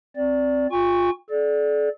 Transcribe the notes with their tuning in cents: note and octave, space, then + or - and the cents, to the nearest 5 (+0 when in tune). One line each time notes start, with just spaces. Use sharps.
C4 +0 D5 -10
F4 +20 G#5 -45 C#6 +0
A4 -40 D5 +0